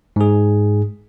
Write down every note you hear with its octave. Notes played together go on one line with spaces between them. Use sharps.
G#2 G#4